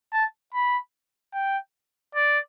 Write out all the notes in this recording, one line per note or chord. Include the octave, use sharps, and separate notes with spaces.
A5
B5
G5
D5